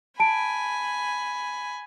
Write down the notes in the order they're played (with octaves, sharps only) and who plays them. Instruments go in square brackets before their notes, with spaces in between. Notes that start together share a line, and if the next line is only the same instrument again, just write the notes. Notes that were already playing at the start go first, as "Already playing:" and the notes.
[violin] G#5 B5 [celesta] A5 D7